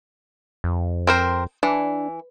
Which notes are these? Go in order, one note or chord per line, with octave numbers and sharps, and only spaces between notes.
F2
C4 A#4 C5
E3 D4